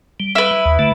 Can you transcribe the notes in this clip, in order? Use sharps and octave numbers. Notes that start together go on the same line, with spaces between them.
G3
E4 B4
D#2
D3 A3